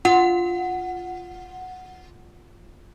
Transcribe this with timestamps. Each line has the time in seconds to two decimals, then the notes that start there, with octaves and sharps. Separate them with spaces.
0.05 F4 F#5